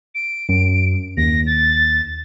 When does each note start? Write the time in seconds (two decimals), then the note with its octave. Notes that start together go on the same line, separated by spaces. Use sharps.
0.15 D7
0.49 F#2
1.17 D#2 A#6
1.47 A6